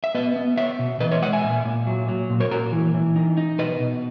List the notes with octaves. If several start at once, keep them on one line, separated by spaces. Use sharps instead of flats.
E5
B3 B4 D#5
B3
B3 C#5 E5
B2
E3 B4 D#5
C#5 E5
G#3 D#5 F#5
E5 G#5
A#2
A#2
F#3
F#3
A#2
A#4 C#5
A#2 F#4 A#4
E3
E3
D#4
D#4
B2 B4 D#5
B2